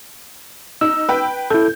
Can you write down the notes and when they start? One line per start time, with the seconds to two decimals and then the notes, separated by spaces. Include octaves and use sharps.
0.81 D#4 E6
1.09 B4 G5
1.50 E4 A4 G6